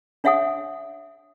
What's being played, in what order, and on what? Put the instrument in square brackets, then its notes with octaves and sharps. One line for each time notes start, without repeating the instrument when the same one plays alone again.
[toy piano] D4 C#5 E5 F#5 G#5 D#6